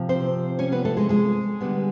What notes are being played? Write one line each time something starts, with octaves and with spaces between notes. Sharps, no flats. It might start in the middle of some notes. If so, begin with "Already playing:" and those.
Already playing: C3 F3
C4 C5
C#4 C#5
B3 B4
A3 A4
G#3 G#4
G#3 G#4
D3 G3 B3